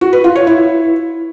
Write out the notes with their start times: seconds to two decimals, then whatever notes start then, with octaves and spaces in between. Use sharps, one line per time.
0.01 F#4
0.13 B4
0.24 F4
0.35 C#5
0.47 E4